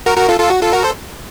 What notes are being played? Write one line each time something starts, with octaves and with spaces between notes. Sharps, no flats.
F#4 A#4
F#4 A#4
F4 A4
F4 A4
F#4
F4 A4
F#4 A#4
A4 C5